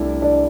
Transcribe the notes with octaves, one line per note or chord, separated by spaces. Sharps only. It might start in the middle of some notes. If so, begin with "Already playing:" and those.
Already playing: C2 A3 D4 E4
D4 D5